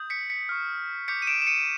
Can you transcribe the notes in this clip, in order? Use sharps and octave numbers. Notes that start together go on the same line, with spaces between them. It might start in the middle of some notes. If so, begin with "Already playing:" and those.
Already playing: D#6 G6
B6 C#7
B6 C#7
C#6 F6
D6 G6 B6 C#7
D#7
D7 E7
E7
C#7 D#7